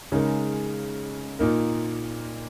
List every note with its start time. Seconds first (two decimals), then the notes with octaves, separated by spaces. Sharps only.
0.12 C#3 G#3 D#4 A#4
1.39 A#2 A#3 D#4 A#4